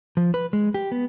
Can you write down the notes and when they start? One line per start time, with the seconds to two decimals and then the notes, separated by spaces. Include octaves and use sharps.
0.17 F3
0.34 B4
0.53 G#3
0.74 G4
0.92 B3